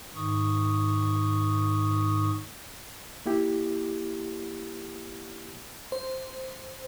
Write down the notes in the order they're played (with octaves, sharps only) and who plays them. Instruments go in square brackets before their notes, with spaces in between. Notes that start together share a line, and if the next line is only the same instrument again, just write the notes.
[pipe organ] G#2 D#3 C#6 D#6
[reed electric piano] A#3 E4 G4
[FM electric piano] C5